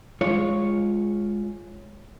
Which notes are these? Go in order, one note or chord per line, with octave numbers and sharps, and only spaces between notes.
G#3 F4 C#5